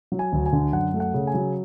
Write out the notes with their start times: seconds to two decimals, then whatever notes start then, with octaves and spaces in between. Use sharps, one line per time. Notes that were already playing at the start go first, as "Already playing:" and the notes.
0.12 F#3
0.19 G#5
0.33 D2
0.46 G#5
0.53 D3
0.72 F#2 F#5
0.94 A3
1.00 F#5
1.14 C#3
1.27 G#5
1.34 F#3